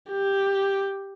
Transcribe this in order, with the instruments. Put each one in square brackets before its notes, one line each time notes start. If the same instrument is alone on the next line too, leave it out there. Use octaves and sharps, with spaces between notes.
[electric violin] G4